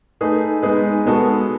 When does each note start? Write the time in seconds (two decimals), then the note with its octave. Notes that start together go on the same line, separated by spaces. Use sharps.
0.21 A3 D#4 G#4 B4
0.62 G#3 B3 D#4 G#4 B4
1.05 B2 G#3 B3 F#4 A4